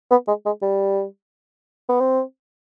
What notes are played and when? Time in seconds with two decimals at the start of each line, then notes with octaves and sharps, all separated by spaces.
0.11 B3
0.28 G#3
0.46 G#3
0.62 G3
1.89 B3
2.00 C4